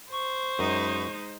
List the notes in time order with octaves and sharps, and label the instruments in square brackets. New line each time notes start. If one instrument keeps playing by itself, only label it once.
[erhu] C5 [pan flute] C#6
[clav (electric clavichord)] F#2 [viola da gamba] G#3 D#4